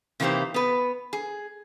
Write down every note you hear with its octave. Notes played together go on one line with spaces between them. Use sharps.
C3 E3 A#3 D#4 G4 C5
B3 B4
G#4